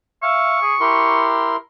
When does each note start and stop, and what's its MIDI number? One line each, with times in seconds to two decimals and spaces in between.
0.23 0.56 76
0.23 0.60 77
0.23 1.27 85
0.62 0.75 68
0.80 1.57 64
0.80 1.53 67
0.80 1.57 70
0.80 1.57 84